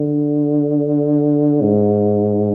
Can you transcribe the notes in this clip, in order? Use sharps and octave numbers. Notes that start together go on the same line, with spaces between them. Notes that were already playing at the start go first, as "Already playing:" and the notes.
Already playing: D3
G#2